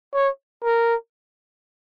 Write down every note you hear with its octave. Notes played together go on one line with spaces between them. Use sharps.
C#5
A#4